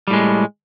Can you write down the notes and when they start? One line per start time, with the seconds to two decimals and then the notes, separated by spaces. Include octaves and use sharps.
0.08 G3
0.10 A2
0.13 G#3